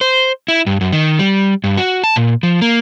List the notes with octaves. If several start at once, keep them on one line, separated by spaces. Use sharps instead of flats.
C5
E4
G2
F#2
D#3
G3
G2
F#4
A5
A#2
F3
A#3